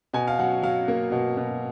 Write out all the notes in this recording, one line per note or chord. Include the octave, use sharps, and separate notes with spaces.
B2 G#5
F5
F#3 F#5
F#3 F5
A#3
B2
B2